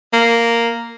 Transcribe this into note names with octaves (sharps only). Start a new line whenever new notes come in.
A#3